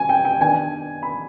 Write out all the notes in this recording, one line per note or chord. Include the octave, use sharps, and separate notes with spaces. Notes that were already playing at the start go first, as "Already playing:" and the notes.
Already playing: G#5
G5
G5
D#3 B3 D4 G#5
B5